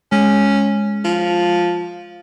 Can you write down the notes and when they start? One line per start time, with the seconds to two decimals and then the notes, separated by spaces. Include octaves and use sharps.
0.12 G#3 C#4
1.05 F3